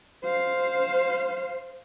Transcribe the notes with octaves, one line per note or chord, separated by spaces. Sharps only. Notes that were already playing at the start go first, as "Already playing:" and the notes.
C5 F5